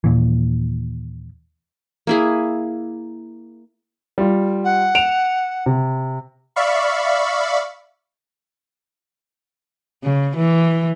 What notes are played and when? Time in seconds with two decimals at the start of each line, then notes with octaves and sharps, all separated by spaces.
0.04 D#2 A#2 E3
2.07 A#3 E4 G#4
4.18 G3 F4
4.65 F#5
4.95 D7 E7 F7
5.66 C3
6.56 D5 E5 F5 B5 C#6
10.04 C#3
10.36 E3